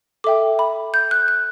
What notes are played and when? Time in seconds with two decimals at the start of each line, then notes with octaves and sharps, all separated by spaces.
0.24 A4 E5 G5 D6
0.59 B5
0.94 G6
1.11 F#6
1.28 F#6